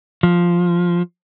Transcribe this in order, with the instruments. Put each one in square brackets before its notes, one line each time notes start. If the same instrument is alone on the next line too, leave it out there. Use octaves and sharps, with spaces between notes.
[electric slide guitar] F3